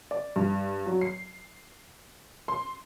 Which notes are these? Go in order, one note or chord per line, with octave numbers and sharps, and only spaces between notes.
D5
G2
F#3
C7
C6